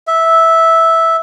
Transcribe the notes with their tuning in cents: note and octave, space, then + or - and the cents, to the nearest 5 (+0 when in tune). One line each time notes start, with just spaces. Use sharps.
E5 -10